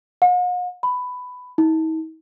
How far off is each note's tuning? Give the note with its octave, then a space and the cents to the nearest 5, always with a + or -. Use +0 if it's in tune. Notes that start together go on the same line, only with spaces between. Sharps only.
F#5 -45
B5 +15
D#4 +45